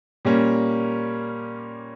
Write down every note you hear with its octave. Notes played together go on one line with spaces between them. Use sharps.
A#2 G3 A#3 C#4